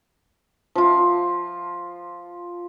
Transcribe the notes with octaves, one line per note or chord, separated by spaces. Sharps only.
F3 F4